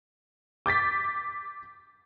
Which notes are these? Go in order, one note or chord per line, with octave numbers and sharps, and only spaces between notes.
D6 G6 A6 B6